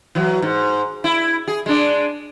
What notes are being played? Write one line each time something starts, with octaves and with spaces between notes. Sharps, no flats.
E3 F#3
G#2
E4
G#4
G#3 D4